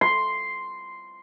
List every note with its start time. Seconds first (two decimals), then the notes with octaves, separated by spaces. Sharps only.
0.01 C6